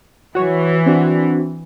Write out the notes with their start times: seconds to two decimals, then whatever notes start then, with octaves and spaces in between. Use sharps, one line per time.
0.35 E3 F#4 C#5
0.86 C4 D4 F#4